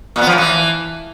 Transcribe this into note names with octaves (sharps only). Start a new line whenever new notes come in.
A#2
B3
F3
A2
E3